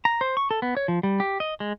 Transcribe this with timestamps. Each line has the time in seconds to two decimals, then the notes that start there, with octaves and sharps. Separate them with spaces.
0.05 A#5
0.21 C5
0.37 C#6
0.51 A4
0.62 B3
0.77 C#5
0.88 F3
1.03 G3
1.20 G4
1.40 D#5
1.60 G#3